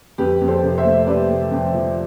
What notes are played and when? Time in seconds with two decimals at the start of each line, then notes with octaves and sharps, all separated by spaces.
0.18 F2 G4 B4
0.41 F2
0.48 A4 C5
0.63 C3
0.78 C5 E5
0.85 A3
1.06 C3 B4 D5
1.29 A3
1.51 F2
1.74 F3